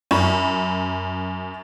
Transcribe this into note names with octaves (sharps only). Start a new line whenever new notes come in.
F#2 B5